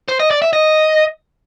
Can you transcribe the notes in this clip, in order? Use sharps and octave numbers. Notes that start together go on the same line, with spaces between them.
C5
D#5
D5
E5
D#5